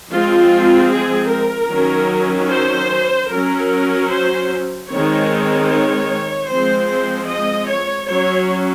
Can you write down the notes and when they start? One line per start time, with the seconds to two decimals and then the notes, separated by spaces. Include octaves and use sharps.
0.11 F3 G#3 C4 F4
0.92 G#4
1.31 A#4
1.71 D#3 F#3 C#4
2.50 C5
3.31 F#3 C#4 A#4
4.10 C5
4.89 D#3 G#3 C4 C#5
5.69 C#5
6.48 F3 G#3 C4 C5
6.88 C5
7.28 D#5
7.69 C#5
8.08 F#3 C#4 C#5